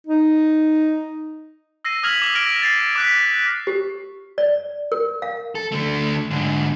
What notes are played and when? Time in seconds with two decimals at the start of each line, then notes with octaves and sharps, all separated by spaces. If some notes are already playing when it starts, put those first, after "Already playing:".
0.07 D#4
1.85 E6 A#6 C7 D#7
2.03 D#6 F6 G#6 B6 F7 F#7
2.22 D6 F7
2.34 E6 F6 A#6 D7 F7
2.62 A6 C7
2.95 D6 F#6 B6
3.67 G4
4.38 D5
4.92 A#4
5.22 F5
5.55 A4
5.72 D3 A3
6.31 G#2 D3